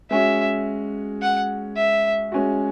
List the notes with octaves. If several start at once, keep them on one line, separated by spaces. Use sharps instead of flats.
G#3 C#4 F#4 E5
F#5
E5
G#3 C#4 F#4